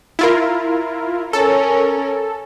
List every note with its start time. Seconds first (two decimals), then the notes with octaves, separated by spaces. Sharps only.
0.19 E4 F4 A#4
1.33 C#4 A4 A#4